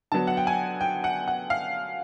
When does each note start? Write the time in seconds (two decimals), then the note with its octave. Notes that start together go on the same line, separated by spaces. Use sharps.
0.12 D3 F#3 B3 A5
0.27 F#5
0.37 G5
0.47 G#5
0.81 G5
1.04 F#5
1.28 F#5
1.50 F5